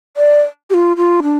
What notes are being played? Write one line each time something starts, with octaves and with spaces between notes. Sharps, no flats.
D5
G4
F4
F4
D4